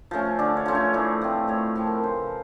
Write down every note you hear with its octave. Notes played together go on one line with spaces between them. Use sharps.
F3 A3 C#4
D3 D5
C#5
F3 A3 C#4 C5
C#5
A2 D5
F3 A3 C4
A2 C#5
F3 A3 C4
A#4
B4
C#3 C5